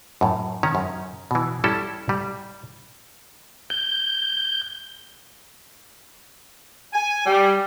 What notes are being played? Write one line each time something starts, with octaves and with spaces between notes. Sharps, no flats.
F#2 A2
D#3 C#4 A#5
F#2
B2 E3
G3 C#4 E4 A4
G3
G6
G#5
G3